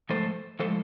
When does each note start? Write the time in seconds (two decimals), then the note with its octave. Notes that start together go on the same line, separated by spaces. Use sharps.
0.10 G#2 F3 A3 A4 C5
0.59 A2 F3 G#3 A4 C5